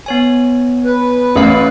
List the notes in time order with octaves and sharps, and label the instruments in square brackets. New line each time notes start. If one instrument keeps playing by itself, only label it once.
[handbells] B3 C#5 G#5
[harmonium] B4
[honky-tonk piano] A1 [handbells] G#4 F5